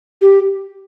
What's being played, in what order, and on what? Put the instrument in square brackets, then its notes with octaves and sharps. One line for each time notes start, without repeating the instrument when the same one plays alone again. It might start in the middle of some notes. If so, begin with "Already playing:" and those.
[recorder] G4